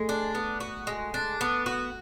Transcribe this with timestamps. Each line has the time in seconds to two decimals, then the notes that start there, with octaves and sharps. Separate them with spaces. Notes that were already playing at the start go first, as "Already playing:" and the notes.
Already playing: G#3 A3
0.09 D4
0.35 B3
0.60 F#4
0.87 G#3
1.14 D4
1.41 B3
1.66 F#4